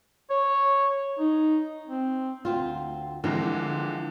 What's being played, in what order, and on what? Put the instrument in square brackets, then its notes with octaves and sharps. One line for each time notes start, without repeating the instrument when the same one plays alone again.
[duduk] C#5
D#4
C4
[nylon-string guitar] D2 C4 F4
[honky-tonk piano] D3 E3 G#3 [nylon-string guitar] F3 C4 A#4